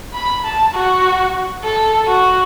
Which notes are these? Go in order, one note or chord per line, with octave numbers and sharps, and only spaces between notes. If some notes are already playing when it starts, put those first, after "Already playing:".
B5
A5
F#4
A4
F#4